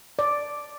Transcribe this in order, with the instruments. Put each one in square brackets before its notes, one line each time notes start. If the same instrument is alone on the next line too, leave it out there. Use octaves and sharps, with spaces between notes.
[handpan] D5